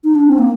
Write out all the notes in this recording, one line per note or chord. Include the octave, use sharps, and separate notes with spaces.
D#4
D4
C4
A#3